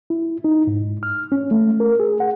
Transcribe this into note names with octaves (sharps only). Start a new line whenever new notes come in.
E4
D#4
G#2
F6
C#4
A3
A#4
G#4
F#5